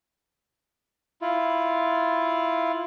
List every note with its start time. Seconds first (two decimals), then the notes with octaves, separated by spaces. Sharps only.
1.22 E4 F4